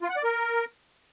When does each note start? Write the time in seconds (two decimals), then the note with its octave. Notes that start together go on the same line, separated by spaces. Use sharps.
0.02 F4
0.09 F#5
0.17 D5
0.24 A#4